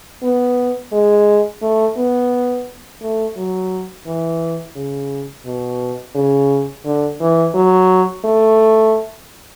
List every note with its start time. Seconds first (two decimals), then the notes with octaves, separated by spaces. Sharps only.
0.23 B3
0.93 G#3
1.62 A3
1.97 B3
3.02 A3
3.37 F#3
4.06 E3
4.76 C#3
5.45 B2
6.15 C#3
6.85 D3
7.20 E3
7.55 F#3
8.25 A3